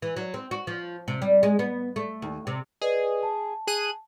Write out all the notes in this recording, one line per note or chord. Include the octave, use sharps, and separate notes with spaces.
E3
F#3
C4
F#4
F3
C3
G3
G#3
B3
A3
D#2
C3
G#4 B4 D5 D#5
A5
G#4 F#6 D#7